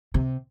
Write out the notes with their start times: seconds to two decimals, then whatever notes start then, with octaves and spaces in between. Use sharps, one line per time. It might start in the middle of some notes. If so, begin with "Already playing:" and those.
0.14 C3